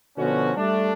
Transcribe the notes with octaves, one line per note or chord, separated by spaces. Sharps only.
B2 D3 F3 B3 C#4 F#4
G3 A3 D4